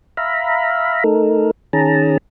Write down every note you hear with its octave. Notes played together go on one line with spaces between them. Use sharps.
E5 F5 A#5 B5
A3 D#4 A4 A#4
D#3 C#4 G#4 A5 A#5